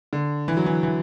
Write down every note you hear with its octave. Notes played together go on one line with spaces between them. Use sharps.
D3
E3
F#3
E3
E3